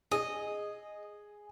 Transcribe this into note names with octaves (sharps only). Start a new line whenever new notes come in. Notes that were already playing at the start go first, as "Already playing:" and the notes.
G#4 D#5